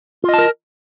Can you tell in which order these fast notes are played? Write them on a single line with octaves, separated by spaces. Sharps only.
F4 D#5 A5 A#4